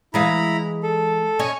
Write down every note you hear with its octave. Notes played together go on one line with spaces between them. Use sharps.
E3 G#3 E4 F5 A#5 B5
A4
C#4 D#5 G#5 C#6